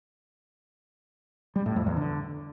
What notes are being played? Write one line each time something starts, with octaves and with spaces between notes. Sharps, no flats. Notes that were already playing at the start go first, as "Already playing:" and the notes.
G3
A2
F2
E2
D3